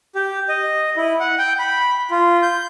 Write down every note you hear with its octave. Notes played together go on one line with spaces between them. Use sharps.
G4
D#5
E4
F#5
G5
B5
F4
G6